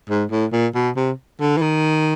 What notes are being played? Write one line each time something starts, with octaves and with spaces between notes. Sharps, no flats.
G#2
A2
A#2
B2
C3
D3
E3
D#3